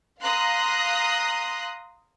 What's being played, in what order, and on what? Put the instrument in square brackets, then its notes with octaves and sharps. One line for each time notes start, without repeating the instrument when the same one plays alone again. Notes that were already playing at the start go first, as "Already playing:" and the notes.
[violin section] F5 A#5 C6 D#6 F#6 A#6